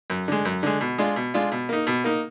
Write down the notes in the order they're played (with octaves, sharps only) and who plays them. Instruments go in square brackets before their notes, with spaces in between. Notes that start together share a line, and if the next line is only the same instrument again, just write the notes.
[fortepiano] F#2
D3 G#3
F#2
D3 G#3
B2
G#3 D4 F4
B2
G#3 D4 F4
B2
A#3 D#4
B2
A#3 D#4